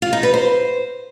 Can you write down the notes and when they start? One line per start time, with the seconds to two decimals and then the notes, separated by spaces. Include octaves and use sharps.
0.02 F4
0.13 D#4
0.23 B4
0.34 C5